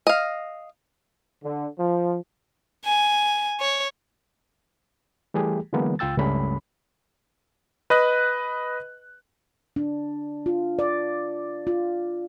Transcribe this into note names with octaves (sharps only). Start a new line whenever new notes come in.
D#5 F5
D3
F3
G#5
C#5
E3 G3 A3 G4 G#4
D3 E3 F#3 G#3 A#3 B3
C#2 F4 G5 E6 A6
C#2 G2 G3 A3 C#4 B5
B4 D#5 F#6
D4
F4
D5
F4